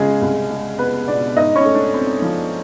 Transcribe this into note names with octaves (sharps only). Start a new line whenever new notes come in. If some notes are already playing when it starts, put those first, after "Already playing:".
Already playing: C#3 G#3 G#4
C2
G#3
B3 B4
B2 D4 D5
G#2 D#4 D#5
C#4 C#5
A3
D4 D5
C4
F3